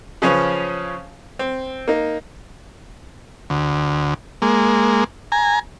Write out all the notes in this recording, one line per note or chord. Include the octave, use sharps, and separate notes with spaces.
C#3 F3 C#4 B4 C#5
C4
A#3 D#4
D2
G#3 A#3
G#5 A#5